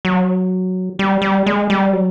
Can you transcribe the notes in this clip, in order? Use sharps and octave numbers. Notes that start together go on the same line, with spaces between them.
F#3
G3
G3
G#3
G3
F#3